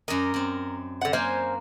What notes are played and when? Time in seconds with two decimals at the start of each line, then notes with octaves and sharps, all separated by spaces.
0.08 F#2 A#4 D5 D#5
0.34 F#2 C4
1.01 D3 F#5
1.13 F#3 A#3 C5 F5 G#5